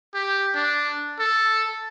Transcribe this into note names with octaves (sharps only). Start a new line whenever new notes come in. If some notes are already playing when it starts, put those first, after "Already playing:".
G4
D4
A4